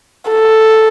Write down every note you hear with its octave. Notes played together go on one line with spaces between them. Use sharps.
A4